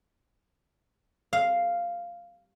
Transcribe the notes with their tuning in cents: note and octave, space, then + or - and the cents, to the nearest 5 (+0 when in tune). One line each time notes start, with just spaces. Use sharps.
F5 -5